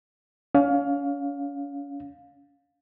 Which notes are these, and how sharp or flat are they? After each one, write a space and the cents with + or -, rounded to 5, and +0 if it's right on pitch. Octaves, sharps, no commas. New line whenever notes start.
C#4 +35 F5 +15